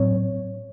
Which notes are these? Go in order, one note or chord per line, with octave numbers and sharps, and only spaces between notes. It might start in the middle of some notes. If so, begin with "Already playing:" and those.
Already playing: A2 F#3 C4 C#5